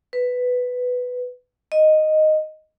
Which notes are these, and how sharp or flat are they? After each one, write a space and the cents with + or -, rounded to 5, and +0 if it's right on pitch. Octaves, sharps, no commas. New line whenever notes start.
B4 +5
D#5 -5